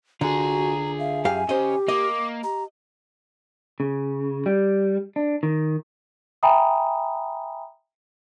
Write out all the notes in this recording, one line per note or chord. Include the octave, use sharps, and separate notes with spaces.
D3 F4 F#4 G#4 A#5
E5 F5
F#2 G4 F5 G#5
C#3 G4 C5 D#5
A#3 D#5 D6
G4 A#5
C#3
G3
D4
D#3
E5 G5 G#5 A#5 B5 D#6